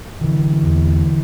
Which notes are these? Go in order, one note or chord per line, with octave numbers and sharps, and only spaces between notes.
D3 E3
E2